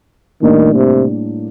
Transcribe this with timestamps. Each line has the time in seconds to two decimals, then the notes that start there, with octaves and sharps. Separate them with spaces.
0.42 A2 D#3 G3 A#3 D4
0.75 C3